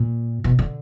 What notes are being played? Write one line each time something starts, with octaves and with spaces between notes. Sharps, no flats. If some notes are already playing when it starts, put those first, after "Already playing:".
Already playing: A#2
B2
D3